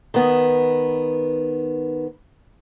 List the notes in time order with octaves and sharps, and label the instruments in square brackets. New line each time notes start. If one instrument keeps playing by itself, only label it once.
[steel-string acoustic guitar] D#3 B3